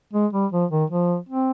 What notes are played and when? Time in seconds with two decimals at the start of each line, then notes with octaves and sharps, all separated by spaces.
0.13 G#3
0.33 G3
0.52 F3
0.71 D#3
0.90 F3
1.29 C4